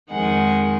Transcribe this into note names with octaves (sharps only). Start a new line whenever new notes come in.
F2 D#3 G#3 F#5